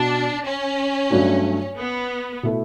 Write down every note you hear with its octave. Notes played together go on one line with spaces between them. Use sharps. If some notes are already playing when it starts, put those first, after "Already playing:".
Already playing: B2 D4 F#4
C#4
G2 F#3 A3 D4 F#4
B3
B2 A3 E4 A4